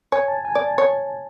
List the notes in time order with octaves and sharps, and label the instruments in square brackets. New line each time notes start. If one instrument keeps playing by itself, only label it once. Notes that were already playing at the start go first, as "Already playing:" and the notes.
[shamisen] C#5 [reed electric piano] G#5
[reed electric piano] A5
G#5
[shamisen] D5
[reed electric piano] A5
[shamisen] C#5